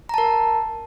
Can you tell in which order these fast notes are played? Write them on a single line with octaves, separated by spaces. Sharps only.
A#5 A5 A#4